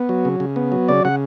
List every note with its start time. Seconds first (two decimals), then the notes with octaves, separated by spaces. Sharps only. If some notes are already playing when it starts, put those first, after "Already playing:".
Already playing: B3
0.09 F#3
0.25 C#3
0.40 C#3
0.56 B3
0.72 F#3
0.88 C#3 D5
1.05 C#3 F#5